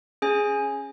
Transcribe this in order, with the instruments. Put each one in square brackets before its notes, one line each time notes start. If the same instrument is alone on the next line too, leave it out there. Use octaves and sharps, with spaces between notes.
[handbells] C#4 G#4 G#5